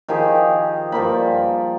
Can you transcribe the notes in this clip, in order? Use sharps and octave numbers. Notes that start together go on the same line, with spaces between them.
D#3 F3 G4 G#4
G2 F3 A#3 B5